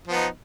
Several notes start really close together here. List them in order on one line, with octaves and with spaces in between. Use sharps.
F3 B3 D#4